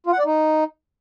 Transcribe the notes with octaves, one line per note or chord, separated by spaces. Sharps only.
F4
F#5
D5
D#4